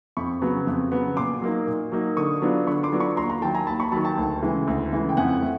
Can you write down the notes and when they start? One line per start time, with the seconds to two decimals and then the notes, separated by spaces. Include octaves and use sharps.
0.17 F2 B5 C#6
0.42 C#3 F#3 B3
0.67 F2
0.92 C#3 F#3 B3
1.17 A#2 C6 D6
1.42 F#3 A#3 D#4
1.67 A#2
1.92 F#3 A#3 D#4
2.17 D3 C#6 D#6
2.42 F#3 B3 D4 F4
2.67 D3 B5 C#6
2.83 C6 D6
2.92 F#3 B3 D4 F4
3.00 B5 C#6
3.17 D#2 A#5 C6
3.29 A#5 C6
3.42 D#3 G5 A5
3.45 F#3
3.55 G#5 A#5
3.67 D#2 A5 B5
3.80 B5 C#6
3.92 F#3 A5 B5
3.96 D#3
4.05 G5 A5
4.18 D2
4.42 C#3 E3 G#3
4.67 D2
4.93 C#3 E3 G#3
5.09 G5
5.17 F2 F#5 G#5
5.42 A3